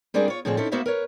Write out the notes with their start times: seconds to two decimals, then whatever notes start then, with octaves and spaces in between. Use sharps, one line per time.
0.14 G3 C4 D4 F4 G#4 A#4
0.28 F4 C#5
0.45 A2 D3 F3 C4 G#4
0.58 C4 C#4 D#4 E4 A4
0.71 A#3 B3 F#4 C5 E5 F5
0.86 A#4 B4 C#5